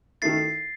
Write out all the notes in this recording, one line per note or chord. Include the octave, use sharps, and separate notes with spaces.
D#3 A3 E4 A6 C7